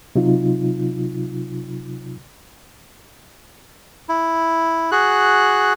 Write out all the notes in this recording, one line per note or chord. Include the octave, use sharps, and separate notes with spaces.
C3 F#3 D#4 F4
E4
F#4 G#4 F#6